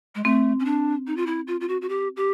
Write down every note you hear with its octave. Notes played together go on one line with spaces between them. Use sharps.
G#3
A3 C4
C#4
D4
D#4
F4
E4
F4
F4
F#4
F#4
G4
G4